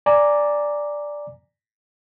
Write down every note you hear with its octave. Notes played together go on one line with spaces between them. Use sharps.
D5 G#5 A#5 D6